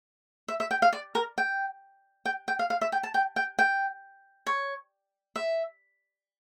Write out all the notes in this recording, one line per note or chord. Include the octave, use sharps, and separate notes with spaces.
E5
E5
G5
F5
D5
A#4
G5
G5
G5
F5
F5
E5
G5
A5
G5
G5
G5
C#5
E5